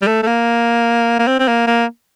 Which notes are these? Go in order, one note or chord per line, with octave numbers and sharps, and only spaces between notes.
G3
A3
A3
A#3
A#3
C4
C4
A#3
A#3